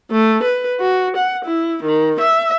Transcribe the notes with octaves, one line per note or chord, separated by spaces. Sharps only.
A3
B4
F#4
F#5
E4
D#3
E5